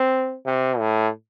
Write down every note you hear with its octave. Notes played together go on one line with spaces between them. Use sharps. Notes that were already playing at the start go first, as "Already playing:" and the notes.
Already playing: C4
C3
A2